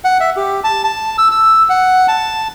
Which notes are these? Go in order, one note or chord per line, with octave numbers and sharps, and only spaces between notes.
F#5
E5
G4
A5
A5
E6
E6
F#5
A5